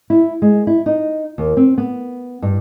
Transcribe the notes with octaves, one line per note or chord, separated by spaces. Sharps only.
E4
G#3
E4
D#4
D#2
C4
B3
G2